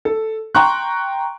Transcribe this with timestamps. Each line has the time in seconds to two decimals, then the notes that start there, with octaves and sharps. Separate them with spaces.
0.05 A4
0.55 G5 A#5 C6 C#6 F#6